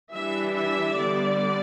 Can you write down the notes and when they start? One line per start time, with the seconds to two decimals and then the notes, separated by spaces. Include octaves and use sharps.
0.12 E3 G3 D4 E5
0.54 E5
0.96 D3 G3 B3 D5